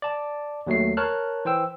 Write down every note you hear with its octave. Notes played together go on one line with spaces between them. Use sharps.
D5 A5
D#2 F#3 A3 C7
A#4 C#5 A5 F6 F#6
E3 C5 G5 E6